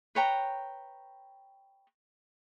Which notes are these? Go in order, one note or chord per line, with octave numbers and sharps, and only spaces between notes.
B4 C#5 G5 A#5